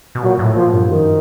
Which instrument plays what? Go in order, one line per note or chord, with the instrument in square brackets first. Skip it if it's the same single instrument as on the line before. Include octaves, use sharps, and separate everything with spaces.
[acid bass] B2
[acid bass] A#2 [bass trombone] F#3
[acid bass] A2
[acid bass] A#2 [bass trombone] F3
[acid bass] G2
[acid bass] F#2 [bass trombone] D#3